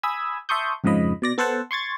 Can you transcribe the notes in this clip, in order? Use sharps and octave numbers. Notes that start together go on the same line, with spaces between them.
G#5 B5 D#6 E6 G#6
E5 A5 C6 C#6 D#6 G6
F2 G#2 C#3 F3 D#5 B5
B2 D5 A#6
B3 A4 C5 F#5 A5
C6 C#6 G#6 A6